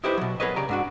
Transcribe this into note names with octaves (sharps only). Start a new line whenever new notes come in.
D#4 E4 G4 B4 C5
B2 F#3
B3 G#4 A#4 B4 C#5 D#5
C#3 G4 D5 A#5
G#2 D4 F#4